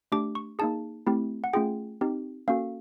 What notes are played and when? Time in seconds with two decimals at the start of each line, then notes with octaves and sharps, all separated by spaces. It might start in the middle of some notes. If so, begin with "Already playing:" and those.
0.12 A3 D4 G4 D6
0.35 C#6
0.59 A#3 D#4 G#4 A5
1.07 A3 C4 E4 G4
1.44 F#5
1.53 A3 C#4 F4 G#4 G5
2.01 C4 D#4 G4
2.48 A#3 C#4 F#4 A4 F5